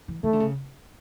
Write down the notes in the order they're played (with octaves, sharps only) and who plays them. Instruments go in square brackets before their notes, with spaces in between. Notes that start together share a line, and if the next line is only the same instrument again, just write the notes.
[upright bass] E3
[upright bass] D#3 [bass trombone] A3
[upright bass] D3
C#3